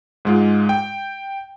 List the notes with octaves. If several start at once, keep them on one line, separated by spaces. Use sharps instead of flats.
G#2 G#3 F4
G5